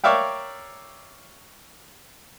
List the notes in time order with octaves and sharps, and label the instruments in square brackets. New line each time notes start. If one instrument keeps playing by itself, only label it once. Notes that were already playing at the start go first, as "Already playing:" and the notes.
[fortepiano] A#4 C#5 D5 E5 F5 G5